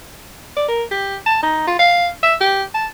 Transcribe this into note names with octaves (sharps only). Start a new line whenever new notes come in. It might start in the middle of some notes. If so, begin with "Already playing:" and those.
D5
A#4
G4
A5
D#4
F4
F5
E5
G4
A5